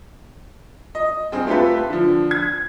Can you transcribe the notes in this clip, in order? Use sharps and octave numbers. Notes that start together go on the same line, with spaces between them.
D#5
G2 C4 G#4
A3 F4 G4 A4 B4
D3 F3
G#6